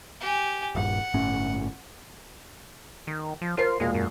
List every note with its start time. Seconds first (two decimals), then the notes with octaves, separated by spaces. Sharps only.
0.21 G4 G#5
0.75 D#1 G2 F#5
1.14 G1 A2 C#4
3.07 D#3
3.42 F3
3.57 F4 A#4 C5 C7
3.80 E1 A#2 G#3 F5
3.95 F#2